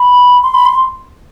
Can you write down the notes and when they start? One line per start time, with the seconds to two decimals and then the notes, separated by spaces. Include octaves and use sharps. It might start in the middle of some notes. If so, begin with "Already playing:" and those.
Already playing: B5
0.43 C6
0.54 B5
0.65 C6